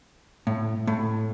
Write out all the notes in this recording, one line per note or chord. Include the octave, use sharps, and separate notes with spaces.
A2
A2